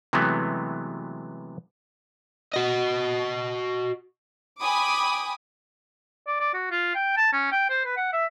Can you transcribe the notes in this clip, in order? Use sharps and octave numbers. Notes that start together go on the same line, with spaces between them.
C3 E3 F#3 G#3 A3 B3
F#4 D#5
G5 G#5 B5 D6 D#6
D5
D5
F#4
F4
G5
A5
C#4
G5
C5
B4
F#5
E5